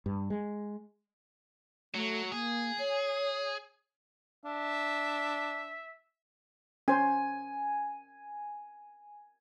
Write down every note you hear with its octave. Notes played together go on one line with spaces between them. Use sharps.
G2
G#3
F#3 A3
A#3 G#4
C#5
D4 E5
C#4 C5 G#5